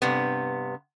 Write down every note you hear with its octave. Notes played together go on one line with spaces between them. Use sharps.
G2 C3 B3